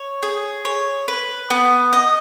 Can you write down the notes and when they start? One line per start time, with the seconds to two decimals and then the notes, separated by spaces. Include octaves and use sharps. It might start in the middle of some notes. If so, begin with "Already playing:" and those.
Already playing: C#5
0.23 G#4
0.65 C#5
1.08 B4
1.50 B3
1.93 D#5